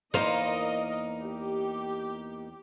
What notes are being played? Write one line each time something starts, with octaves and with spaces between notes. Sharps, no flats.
E2 A#3 D#4 A#4 C5 D#5 F5
G4